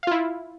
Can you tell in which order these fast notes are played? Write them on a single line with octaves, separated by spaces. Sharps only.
F5 F4 E4